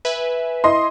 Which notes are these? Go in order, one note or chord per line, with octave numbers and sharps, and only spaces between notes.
B4 E5 G#5
E4 D#5 C6